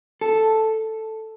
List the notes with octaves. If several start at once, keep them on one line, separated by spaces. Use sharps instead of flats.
A4